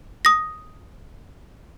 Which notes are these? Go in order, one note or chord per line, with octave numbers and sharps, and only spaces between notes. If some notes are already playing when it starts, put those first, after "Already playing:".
D#6 A#6